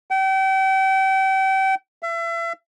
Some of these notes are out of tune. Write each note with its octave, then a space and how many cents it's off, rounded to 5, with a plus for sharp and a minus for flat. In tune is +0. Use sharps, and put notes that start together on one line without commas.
G5 -35
E5 +35